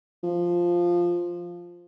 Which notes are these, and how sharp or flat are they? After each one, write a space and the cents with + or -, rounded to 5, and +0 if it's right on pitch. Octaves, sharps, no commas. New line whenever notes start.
F3 +0